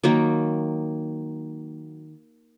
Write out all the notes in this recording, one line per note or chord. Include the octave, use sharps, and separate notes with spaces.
D#3 F#3 A#3